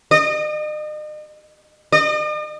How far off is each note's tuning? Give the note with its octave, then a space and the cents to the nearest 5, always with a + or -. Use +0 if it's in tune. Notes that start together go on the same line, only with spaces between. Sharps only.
D#5 -40
D#5 -45